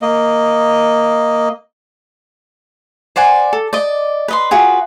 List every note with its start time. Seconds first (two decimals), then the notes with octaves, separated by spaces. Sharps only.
0.02 A#3 D#5
3.16 C5 D5 F#5 G#5
3.53 A4
3.73 D5 D#5
4.28 B4 D#5 C6
4.51 F4 F#4 G#4 B4